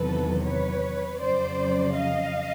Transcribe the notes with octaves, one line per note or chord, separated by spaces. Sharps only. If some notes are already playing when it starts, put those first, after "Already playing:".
Already playing: E2 C3 D#3 F#3 A4 B4
B4 C#5
F2 C#3 F#3 C5 D5
D#5 F5